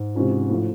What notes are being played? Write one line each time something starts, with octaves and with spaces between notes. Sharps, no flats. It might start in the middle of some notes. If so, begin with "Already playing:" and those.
Already playing: G#2
C3 E3 G#3 C#4 F4
A2 F3 A3